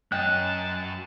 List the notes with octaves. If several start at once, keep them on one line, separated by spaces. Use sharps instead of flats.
F#2 C#4 D#5 G5 A5 F#6